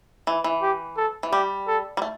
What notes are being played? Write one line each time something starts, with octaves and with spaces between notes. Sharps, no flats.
E3
E3
G4
A4
E3
G3 G4
A4
G3
A3